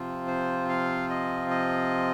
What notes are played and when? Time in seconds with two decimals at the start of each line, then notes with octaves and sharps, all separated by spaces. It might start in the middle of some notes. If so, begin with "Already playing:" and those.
Already playing: C3 F3 C4 F4
0.27 C5
0.69 F5
1.10 D#5
1.50 D#5